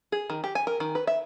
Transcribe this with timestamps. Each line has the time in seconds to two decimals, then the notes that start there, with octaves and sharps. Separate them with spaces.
0.12 G#4
0.30 D#3
0.44 G4
0.55 G#5
0.67 A#4
0.80 D#3
0.95 B4
1.07 E5